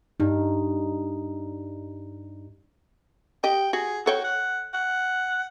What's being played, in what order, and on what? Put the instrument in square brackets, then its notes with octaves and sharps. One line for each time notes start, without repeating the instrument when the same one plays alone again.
[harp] G2 [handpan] D#4
[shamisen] G4 D#5 [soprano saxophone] G5
[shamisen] F#4 [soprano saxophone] G#4
[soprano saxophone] F#4 [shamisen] A4 C#5 G5
[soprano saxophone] F#5
F#5